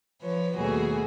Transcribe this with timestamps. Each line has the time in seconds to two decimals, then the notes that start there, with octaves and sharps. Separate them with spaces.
0.21 F3 B4 C#5
0.56 D#2 B2 G3 A3 F#4 G#4